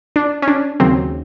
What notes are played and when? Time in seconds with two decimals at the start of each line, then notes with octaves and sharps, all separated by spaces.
0.16 D4
0.42 C#4
0.48 D4
0.80 D#2 C#3 F#3 C4